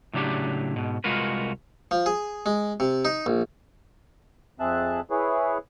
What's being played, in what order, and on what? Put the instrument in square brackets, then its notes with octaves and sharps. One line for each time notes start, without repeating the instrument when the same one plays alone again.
[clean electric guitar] A2 C#3 F#3 D4 G4
G#2 B2
C2 G#3 F4 F#4 A#4 B4
[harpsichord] F3
G#4
G#3
C3
D#4
A#1
[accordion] F2 C4 G#4 E5 A5 F#6
E4 G#4 B4 C#5